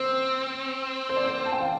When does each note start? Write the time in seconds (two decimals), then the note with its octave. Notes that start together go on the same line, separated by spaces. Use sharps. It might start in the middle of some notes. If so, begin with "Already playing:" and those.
Already playing: C4 C5
1.09 C5
1.17 D5
1.24 C5
1.46 A5
1.52 G5
1.61 F5